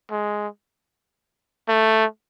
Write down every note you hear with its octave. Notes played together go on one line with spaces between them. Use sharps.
G#3
A3